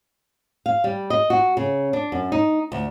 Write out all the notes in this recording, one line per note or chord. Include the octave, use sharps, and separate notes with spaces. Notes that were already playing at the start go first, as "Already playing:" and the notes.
F5
G3
D#5
F#4
C#3
D4
F#2
D#4
D2